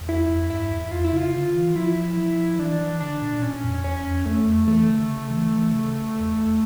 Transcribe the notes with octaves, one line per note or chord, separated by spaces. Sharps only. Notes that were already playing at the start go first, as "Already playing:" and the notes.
E2
F2 E4
F2
G2 E4
E2
F2 F4
E4
C#3 F4
D3
E3
F3 E4
F3
E3 D4
E3
D3 D4
A#2
A#2 C#4
F2
E2 C#4
F2
E2 A3
F2
E3 A3
D3
C#3
E3
E3
C#3
E2